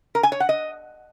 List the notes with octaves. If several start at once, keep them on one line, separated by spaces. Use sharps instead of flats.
A#4
G#5
C#5
F#5
D#5